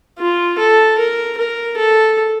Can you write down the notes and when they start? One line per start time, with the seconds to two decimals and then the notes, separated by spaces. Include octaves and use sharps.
0.19 F4
0.59 A4
0.98 A#4
1.38 A#4
1.77 A4